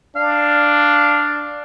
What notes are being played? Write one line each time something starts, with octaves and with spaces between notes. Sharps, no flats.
D4 F5